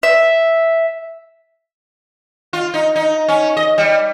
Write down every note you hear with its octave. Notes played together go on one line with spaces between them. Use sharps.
E5
F4
D#4
D#4
C#4
D#5
G3